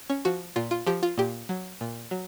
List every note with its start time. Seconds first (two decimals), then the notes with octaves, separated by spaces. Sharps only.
0.10 C#4
0.25 F3 F#4
0.56 A#2 F4
0.71 F4
0.87 F3 G4
1.03 F4
1.18 A#2 G4
1.49 F#3
1.81 A#2
2.11 F#3